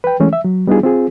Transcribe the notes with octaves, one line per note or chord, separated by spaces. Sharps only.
B4 G5
E3 G#3 A3 C#4
E5
F#3
G3 B3 D4 D#4 F4 G#4
C4 F4 G#4